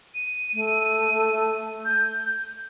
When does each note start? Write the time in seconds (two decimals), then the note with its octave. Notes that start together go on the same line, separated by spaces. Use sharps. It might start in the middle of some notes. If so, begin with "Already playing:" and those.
0.15 D#7
0.54 A3
1.85 G6